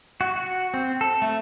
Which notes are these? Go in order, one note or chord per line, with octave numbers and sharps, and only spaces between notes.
F#4
F#4
C4
A4
A3